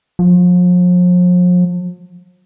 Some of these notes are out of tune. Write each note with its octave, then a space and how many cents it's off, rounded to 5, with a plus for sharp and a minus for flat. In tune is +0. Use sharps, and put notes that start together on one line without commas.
F3 +40